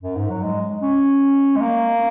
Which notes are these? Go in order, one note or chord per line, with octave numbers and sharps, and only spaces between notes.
F#2
G#2
F#3
G#3
C#4
G#3
A#3